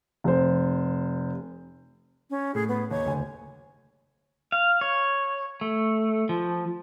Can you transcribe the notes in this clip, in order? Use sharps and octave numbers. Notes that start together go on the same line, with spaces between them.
F1 C5
C#4
A2 G#4
B3
D#2 C#5
F#1 D2 G#5
F5
C#5
A3
F3